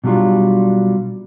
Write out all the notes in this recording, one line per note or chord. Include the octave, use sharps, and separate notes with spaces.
B2 F#3 G3 D4 F4